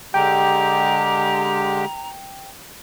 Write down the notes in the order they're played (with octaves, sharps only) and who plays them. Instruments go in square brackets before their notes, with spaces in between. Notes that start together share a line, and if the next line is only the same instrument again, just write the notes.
[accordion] D3 G#3 G4 [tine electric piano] G5 [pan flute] A#5